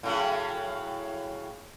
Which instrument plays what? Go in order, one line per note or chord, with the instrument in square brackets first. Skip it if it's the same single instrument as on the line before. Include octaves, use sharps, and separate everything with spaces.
[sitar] A2 C#3 F#3